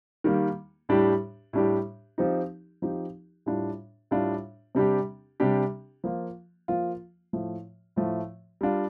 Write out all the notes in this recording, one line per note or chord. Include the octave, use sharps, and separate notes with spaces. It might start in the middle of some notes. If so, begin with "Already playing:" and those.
D#3 G3 A#3
A2 G3 D4 G4
A2 G3 D4 G4
F3 C4 D#4 G4
F3 C4 D#4 G4
A2 G3 D4 F4
A2 G3 D4 F4
C3 G3 D4 G4
C3 G3 D4 G4
F3 A#3 F4
F3 A#3 F4
A2 F3 A3
A2 F3 A3
G3 D4 F4